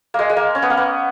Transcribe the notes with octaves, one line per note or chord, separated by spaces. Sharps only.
G#3 A#3
G#3
A#3
C#4
B3
A#3
B3